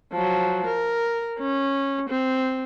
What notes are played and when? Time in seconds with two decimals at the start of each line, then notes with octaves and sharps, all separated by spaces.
0.13 F3 F#3
0.67 A#4
1.39 C#4
2.09 C4